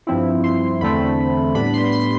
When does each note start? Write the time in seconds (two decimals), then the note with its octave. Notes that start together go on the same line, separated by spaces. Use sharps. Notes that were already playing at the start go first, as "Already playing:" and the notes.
0.07 G2 F3 C4 E4
0.43 C6
0.81 E2 D3 A3 C4 B5
1.55 A2 G3 B3 D4 B5
1.73 C6
1.92 C6